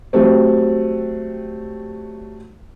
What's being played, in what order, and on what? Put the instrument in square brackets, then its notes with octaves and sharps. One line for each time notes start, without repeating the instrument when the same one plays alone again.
[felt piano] F#3 G3 A3 C4